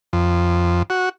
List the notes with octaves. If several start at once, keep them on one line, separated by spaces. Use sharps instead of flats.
F2
F#4